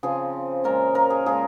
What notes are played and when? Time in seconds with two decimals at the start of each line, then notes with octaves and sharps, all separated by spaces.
0.03 C#3 F3 C4 G#4
0.64 A#2 G#3 C#4 A#4
0.95 A#4
1.10 G#4
1.26 A#2 F3 G#3 G#4